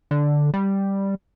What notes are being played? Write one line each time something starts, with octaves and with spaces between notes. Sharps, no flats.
D3
G3